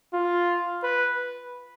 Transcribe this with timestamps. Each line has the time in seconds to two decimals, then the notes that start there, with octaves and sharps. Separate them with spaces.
0.13 F4
0.83 B4